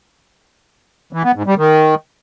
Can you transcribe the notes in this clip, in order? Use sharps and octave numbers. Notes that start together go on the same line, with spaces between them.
E3
B3
G#2
G3
D#3